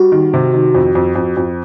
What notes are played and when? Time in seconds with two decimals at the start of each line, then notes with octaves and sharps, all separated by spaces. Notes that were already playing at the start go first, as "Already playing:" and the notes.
Already playing: G3 F#4
0.12 D#3
0.34 C3
0.54 D#3
0.75 F2
0.95 F2
1.16 F2
1.37 F2